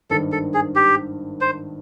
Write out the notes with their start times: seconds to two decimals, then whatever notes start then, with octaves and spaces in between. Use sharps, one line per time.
0.10 G#1 G2 D#3 A4
0.32 A4
0.54 G#4
0.76 G4
1.41 C5